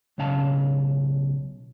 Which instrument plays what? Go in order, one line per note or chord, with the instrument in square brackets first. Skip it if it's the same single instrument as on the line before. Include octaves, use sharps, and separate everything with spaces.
[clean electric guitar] B1 C#3 C#4 F5 A5